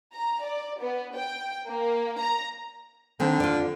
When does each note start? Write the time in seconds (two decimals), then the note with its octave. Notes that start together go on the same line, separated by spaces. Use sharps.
0.12 A#5
0.42 D5
0.80 B3
1.16 G5
1.68 A#3
2.19 A#5
3.20 D3 D#3 C4
3.40 F4 D5